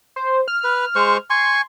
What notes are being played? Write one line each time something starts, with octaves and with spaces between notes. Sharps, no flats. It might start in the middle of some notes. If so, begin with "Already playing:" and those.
C5
F6
B4
G#3 C5 C#6
G#5 C6 C#6